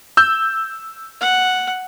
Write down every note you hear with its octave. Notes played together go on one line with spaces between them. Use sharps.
E6 G6
F#5